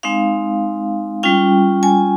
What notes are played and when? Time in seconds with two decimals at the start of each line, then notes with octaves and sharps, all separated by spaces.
0.03 G#3 C4 D#4 F5
1.23 G3 C#4 F4 G5
1.83 G#5